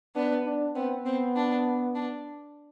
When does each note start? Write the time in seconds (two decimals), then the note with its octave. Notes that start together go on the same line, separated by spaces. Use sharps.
0.15 B3 D4
0.45 D4
0.75 B3 C4
1.05 B3 C4
1.35 D4
1.95 D4